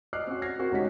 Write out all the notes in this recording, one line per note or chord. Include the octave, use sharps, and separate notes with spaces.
D5 D#5 D6 F6 F#6 C7
C4 C#4 F#4
F6 G#6 A#6 C7
C4 F#4 A#4
E1 C3 C#4 D#4 F#4 B6